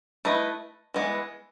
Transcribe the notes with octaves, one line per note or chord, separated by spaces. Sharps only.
A3 E4 B4 D#5
E3 G#3 B3